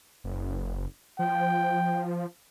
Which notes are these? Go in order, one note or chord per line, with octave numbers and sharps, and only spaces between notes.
F#1
F3 G5